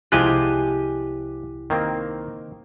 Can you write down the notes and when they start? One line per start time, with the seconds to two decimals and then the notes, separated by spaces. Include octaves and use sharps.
0.12 C2 F3 G#3 E4 F4 G4 G#5 F#6
1.70 D#3 A#3 C4